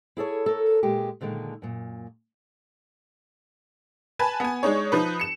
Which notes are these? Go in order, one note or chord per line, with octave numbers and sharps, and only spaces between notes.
E4 G#4 A4 C#5
A4 A#4 C#5
A#2 G#3 G4
A#2 D3 D#3 G#3
F#2 A#2
B4 G#5 A5 B5
B3 G#5
G#3 D4 D#4 C#5
F3 D#4 B4
C#7 E7